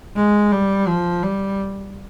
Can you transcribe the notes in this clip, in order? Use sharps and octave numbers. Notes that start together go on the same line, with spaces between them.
G#3
G3
F3
G3